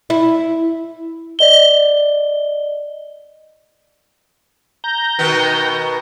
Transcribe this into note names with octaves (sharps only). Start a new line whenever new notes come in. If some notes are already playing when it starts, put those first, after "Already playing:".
E4
D5 D#5 G7
A#5 G6
B2 D#3 B3